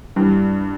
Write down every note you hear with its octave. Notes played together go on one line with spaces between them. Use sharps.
G2 E3 G3